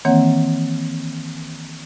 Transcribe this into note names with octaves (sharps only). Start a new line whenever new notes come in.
D#3 E3 A#3 C4 C#5 F#5